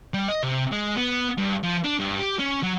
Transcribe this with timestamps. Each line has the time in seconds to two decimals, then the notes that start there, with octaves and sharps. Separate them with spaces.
0.14 G3
0.28 D#5
0.43 C3
0.72 G#3
0.97 B3
1.37 G2
1.63 F3
1.84 D4
1.99 G2
2.19 G4
2.39 C#4
2.63 F#3